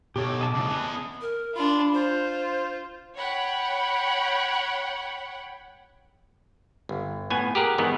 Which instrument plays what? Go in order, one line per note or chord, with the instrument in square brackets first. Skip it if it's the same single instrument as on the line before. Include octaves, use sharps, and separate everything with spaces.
[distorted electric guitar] B2 C#5 [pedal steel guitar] G4 A4
[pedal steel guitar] D#5 A5 D6
[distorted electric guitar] A2 C#3
B3 G#4
[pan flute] A#4
[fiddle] D4 F4 [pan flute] B5
[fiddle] F4 [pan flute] C5
[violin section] C#5 F#5 G5 B5
[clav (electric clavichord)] G1
A2 B3 G#5
G4 G#4 A#4 F#5
G#2 D#3 E3 B3 D#4